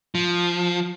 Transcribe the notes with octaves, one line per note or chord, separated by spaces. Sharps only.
F3